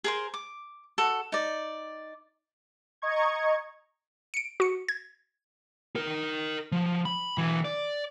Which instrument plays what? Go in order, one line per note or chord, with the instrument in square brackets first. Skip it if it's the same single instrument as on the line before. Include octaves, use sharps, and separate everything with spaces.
[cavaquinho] G#4 A#4 C5
D6
F#4 A4
D#4 D5
[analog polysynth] D#5 A#5 C#6 G#6
[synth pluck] C#7 D7
F#4 C#7
G#6
[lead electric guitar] D#4 A#4
F3
B5
B1 E3
D5